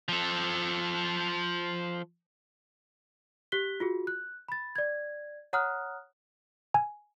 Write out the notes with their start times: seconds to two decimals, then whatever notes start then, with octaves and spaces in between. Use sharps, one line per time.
0.09 F3 A4
3.52 G4 F#6 B6 G7
3.80 F4 F#4 G#4
4.07 F#6
4.49 B5 A6
4.76 D5 G#6
5.53 C#5 F#5 A#5 D#6 F6 F#6
6.74 G#5